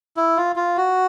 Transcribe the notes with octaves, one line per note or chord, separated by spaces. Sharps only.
E4
F4
F4
F#4